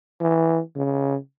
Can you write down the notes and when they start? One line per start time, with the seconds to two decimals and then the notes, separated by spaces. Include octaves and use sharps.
0.20 E3
0.76 C#3